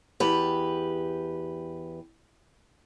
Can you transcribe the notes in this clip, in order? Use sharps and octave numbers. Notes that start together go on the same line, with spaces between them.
E2 G4 B4